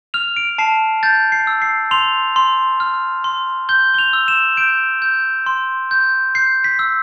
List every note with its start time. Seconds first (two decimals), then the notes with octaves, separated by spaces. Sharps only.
0.14 F6 F7
0.37 D7
0.58 A5 C7
1.03 G6 A6
1.32 C7
1.47 E6
1.62 C7
1.91 C6 F7
2.36 C6
2.80 F6
3.24 C6
3.69 G6 G7
3.94 G7
3.98 F7
4.13 E6
4.28 E7
4.57 G6 D7
5.02 G6
5.46 C6
5.91 G6
6.35 G6 C7
6.64 B6
6.79 E6